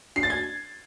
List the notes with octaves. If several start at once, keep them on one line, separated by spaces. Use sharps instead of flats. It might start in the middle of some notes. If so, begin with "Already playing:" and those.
C7
A6
G#6